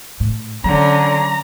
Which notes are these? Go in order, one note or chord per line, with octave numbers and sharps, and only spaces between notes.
A2
D3 F#3 C#4 A#5